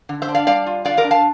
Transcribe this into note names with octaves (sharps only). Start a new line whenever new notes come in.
D3
C5 E5
D4
D5 F5
G3 D5 F5
F4
D3 D5 F5
A#4 D5
D4
F5 A5